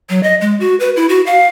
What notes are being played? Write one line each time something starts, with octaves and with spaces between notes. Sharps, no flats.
F#3
D#5
G#3
F#4
B4
E4
F#4
F5